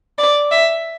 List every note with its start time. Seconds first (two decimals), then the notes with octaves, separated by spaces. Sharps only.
0.18 D5
0.51 E5